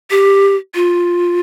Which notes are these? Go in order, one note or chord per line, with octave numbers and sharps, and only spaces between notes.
G4
F4